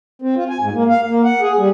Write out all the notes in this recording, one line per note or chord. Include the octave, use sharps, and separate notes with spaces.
C4
F4
G#5
G#2
A#3
F5
A#3
F#5
G#4
G3